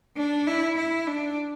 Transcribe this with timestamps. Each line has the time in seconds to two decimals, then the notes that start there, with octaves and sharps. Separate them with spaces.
0.17 D4
0.47 E4
0.78 E4
1.07 D4